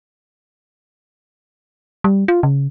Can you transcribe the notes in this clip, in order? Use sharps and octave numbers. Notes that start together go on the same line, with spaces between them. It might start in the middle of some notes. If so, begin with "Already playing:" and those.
G3
F4
C#3